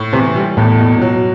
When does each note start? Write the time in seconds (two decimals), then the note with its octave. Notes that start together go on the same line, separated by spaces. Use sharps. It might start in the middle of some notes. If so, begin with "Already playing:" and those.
Already playing: A2
0.13 C3 E3
0.35 G3
0.57 E2 A2
0.79 B2
1.01 F#3